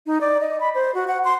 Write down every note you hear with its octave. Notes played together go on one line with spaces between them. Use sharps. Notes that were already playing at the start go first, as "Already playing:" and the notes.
D#4
D5
D#5
B5
C5
F#4
F#5
C6